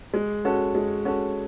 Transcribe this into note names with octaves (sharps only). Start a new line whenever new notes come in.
G#3
C#4 F#4 A4
G#3
C#4 F#4 A4